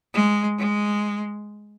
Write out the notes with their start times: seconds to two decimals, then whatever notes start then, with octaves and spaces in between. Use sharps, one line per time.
0.14 G#3
0.58 G#3